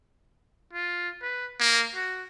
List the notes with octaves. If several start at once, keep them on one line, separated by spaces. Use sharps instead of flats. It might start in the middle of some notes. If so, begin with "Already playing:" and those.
F4
B4
A#3
F#4